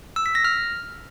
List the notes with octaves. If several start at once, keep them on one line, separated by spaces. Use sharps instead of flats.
E6
B6
A#6
F6